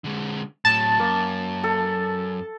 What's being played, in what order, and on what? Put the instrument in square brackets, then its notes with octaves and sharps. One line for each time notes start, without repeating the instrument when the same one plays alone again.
[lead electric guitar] D3 G#3
[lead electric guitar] A2 F#3 [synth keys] A5
[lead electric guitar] F#2 [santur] A#3
[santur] A4